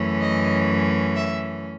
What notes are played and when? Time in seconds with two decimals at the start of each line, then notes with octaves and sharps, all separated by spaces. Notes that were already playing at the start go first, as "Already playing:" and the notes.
Already playing: F#2 E3 A3 C#4
0.20 D#5
1.16 E5